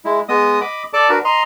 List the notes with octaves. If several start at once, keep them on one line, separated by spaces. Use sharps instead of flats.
G#3 E4
G#3 B3 D#5 D#6
D#5 B5 D6
A4 D5 A5 D6
D4 F#4 A#4 B4
D#5 A#5 C6